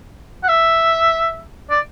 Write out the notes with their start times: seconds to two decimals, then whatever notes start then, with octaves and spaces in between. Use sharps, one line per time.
0.43 F#5
0.49 E5
1.70 D5